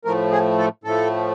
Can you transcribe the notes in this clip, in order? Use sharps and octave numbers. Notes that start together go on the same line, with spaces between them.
A2 F3 A3 A#4
G#4
A4
A2 F3 A3 A4